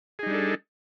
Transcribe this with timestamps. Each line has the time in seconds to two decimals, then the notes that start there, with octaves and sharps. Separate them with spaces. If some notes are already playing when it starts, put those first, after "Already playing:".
0.19 G#4
0.23 D#4
0.27 G3
0.30 D4
0.34 A4